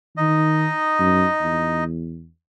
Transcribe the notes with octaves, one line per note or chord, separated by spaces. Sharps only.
D#3 D#4 D#5
F#2
E2